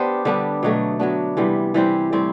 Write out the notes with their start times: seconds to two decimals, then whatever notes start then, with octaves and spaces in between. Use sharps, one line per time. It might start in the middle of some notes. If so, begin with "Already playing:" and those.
Already playing: B3 D4 G4 C5
0.25 D3 G3 B3 D4
0.63 B2 F#3 A3
1.00 F#3 B3 D4
1.37 C3 E3 G3 B3
1.74 E3 G3 C4 G4
2.12 A2 G3 C4 E4